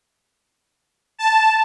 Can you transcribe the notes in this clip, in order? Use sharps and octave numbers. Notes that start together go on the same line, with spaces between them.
A5